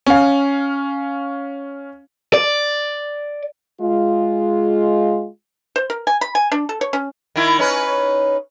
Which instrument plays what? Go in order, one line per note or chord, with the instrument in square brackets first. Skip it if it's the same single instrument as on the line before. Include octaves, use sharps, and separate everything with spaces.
[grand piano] C#4 F5
[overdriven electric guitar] D5
[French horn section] G#3 F4
[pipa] C5
A#4
G#5
B5
G#5
D4
A4
C#5
C#4
[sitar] D#3 E4
C#4 D#4 B4